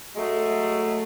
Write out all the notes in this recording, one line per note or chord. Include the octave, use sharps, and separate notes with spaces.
F#3 G#3 A3